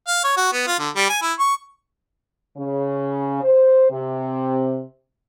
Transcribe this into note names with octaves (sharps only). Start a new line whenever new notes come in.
F5
C#5
F#4
B3
F4
D3
G3
G#5
E4
C#6
C#3
C5
C3